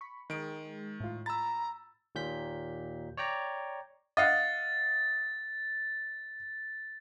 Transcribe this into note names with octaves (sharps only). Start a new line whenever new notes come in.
B5 C#6
D#3 G#3 D7
A2 F4
A#5 B5 E6 A6
D#2 A#2 G6 B6
C#5 D5 G5 A#5
D#5 F5 F#5 A6